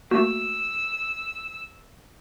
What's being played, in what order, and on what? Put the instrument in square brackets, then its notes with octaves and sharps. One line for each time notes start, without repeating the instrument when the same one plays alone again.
[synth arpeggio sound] A3 A#3 [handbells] F#4 [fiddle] E6